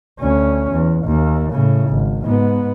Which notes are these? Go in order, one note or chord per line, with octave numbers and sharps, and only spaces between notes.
D2 C#4
E2
D#2
A2 C#3
G#1
G#2 B3